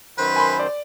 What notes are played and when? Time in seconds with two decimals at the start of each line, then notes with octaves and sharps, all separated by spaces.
0.18 F#2 D#3 B4 C5
0.36 G#5 B5 C6
0.59 D5